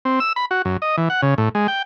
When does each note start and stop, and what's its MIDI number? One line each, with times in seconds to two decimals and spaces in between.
0.05 0.20 60
0.20 0.33 88
0.36 0.45 83
0.51 0.62 66
0.65 0.77 42
0.82 0.96 75
0.97 1.09 52
1.10 1.21 78
1.22 1.34 49
1.38 1.49 45
1.55 1.67 56
1.68 1.82 79